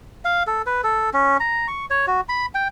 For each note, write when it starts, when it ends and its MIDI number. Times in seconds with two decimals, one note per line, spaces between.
0.25 0.43 77
0.47 0.62 69
0.66 0.81 71
0.84 1.10 69
1.14 1.37 61
1.40 1.68 82
1.68 1.86 85
1.90 2.06 73
2.07 2.21 66
2.29 2.46 83
2.55 2.68 79